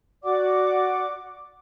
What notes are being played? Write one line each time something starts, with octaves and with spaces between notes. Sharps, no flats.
F#4 D5 F#5 D6